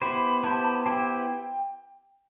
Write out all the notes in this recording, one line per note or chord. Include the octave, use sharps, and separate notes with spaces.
B3 E4 G4 C5 B5
B3 E4 G4 C5 A5
A5
B5
A5
B3 E4 G4 C5 G5